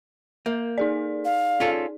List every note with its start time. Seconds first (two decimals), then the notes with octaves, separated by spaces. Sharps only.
0.46 A#3 A#4
0.78 D#4 G#4 D5
1.25 F5
1.60 C#4 F4 A4